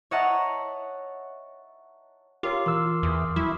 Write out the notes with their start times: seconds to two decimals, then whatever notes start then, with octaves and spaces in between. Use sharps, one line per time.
0.11 C#5 D#5 E5 F#5 A5 A#5
2.43 F4 G4 A#4 C#5 D6 E6 C7
2.66 E3 A#4 C6 E6 F6
3.03 E2 D#6 F6
3.36 F#3 E4 C#6 F6